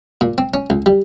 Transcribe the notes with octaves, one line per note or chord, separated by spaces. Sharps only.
A#2
C4
C#4
C#2
G3